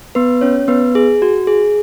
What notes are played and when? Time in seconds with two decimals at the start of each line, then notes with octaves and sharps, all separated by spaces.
0.15 B3 B4
0.41 C#4 C#5
0.68 B3 B4
0.95 G#4
1.22 F#4
1.47 G#4